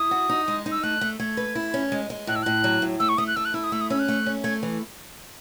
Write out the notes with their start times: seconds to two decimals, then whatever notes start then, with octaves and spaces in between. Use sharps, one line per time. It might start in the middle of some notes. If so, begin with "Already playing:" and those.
Already playing: E4 D#6
0.11 F#4
0.29 D#4
0.48 G#3
0.66 D#4
0.72 E6
0.83 A3 F#6
1.01 A3
1.19 A3 G#6
1.37 B4
1.55 E4
1.74 C#4
1.92 G#3
2.10 G#3
2.27 A2 F#6
2.36 E6
2.43 A2 F#6
2.64 F#3
2.82 A2
3.00 A3 E6
3.09 C#6
3.18 A3 D#6
3.27 F#6
3.36 A3 E6
3.45 F#6
3.54 E4 E6
3.64 D#6
3.72 A3 E6
3.81 D#6
3.90 C#4 E6
3.99 F#6
4.08 A3
4.26 C#4
4.44 A3 G#6
4.63 E3